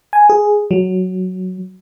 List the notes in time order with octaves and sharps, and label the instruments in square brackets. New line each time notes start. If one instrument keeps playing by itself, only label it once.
[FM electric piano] G#5
G#4
F#3